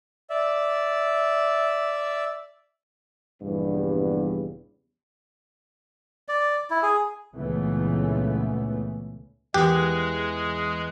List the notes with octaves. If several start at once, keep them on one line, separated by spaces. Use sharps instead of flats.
D5 E5
A#1 E2 G2 C#3 G3 B3
D5
E4
G#4
C#2 A#2 C#3 E3 A3 B3
E2 G#3 G4 G#4 F#6